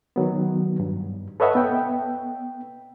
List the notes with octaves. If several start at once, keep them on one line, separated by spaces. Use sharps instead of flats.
D#3 F#3 B3
G2
A4 B4 C#5 D#5 E5 F#5
B3 G5